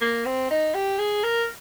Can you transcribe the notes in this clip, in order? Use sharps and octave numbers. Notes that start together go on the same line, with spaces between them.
A#3
C4
D#4
G4
G#4
A#4